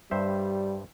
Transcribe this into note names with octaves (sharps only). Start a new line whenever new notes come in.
G2 G3 C5 E5